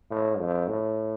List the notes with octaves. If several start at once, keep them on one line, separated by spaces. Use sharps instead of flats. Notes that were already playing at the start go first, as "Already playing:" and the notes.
A2
F2
A2